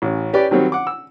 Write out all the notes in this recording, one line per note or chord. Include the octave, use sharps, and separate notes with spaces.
A1 C#4
C#4 G4 B4 D5
D#3 F#3 G3 C4 C#5
F#5 D6
E6